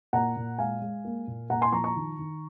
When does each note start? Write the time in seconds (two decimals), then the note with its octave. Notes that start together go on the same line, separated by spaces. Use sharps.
0.13 A#2 F#5 A#5
0.36 A#2
0.58 G#3 F5 G#5
0.81 G#3
1.05 A#3
1.27 A#2
1.50 A#2 F#5 A#5
1.61 G#5 C6
1.72 F3 A#5 C#6
1.84 A#5 C#6
1.96 D#3
2.19 D#3